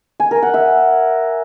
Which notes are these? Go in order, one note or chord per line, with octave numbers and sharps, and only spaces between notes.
G#5
A#4
F#5
E5